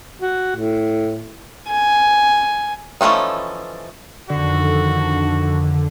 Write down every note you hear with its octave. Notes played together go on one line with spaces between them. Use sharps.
F#4
A2
G#5
E3 F3 A3 C#4 D#4
F2 D3 D#3 F#4